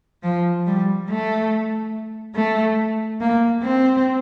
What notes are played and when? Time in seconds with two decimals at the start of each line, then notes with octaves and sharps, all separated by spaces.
0.23 F3
0.67 G3
1.09 A3
2.35 A3
3.21 A#3
3.62 C4